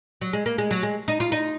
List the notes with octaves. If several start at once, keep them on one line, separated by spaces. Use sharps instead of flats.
F#3
G#3
A#3
G#3
F#3
G#3
D#4
F4
D#4